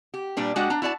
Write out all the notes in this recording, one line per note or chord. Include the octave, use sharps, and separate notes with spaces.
G4
A#2 G3 D4 B4
G#3 D4 F#4 G4
D4 A#5
E4 F#4 D5 A5